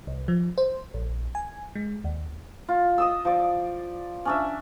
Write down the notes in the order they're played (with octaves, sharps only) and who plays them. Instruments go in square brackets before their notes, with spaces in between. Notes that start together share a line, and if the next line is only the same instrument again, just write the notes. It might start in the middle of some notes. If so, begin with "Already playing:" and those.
[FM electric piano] C2
F3
C5
A#1
G#5
G#3
D#2
[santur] F4
D#5 D#6 E6
F3 D5
C#4 D4 E5